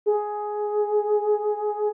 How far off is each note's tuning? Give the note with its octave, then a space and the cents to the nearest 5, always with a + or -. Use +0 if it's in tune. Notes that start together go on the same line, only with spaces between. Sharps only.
G#4 +10